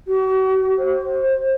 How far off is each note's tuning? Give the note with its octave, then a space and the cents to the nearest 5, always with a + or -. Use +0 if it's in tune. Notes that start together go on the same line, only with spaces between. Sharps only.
F#4 +45
C5 +20